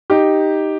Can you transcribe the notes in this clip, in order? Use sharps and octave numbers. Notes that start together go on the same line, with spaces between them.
D#4 G4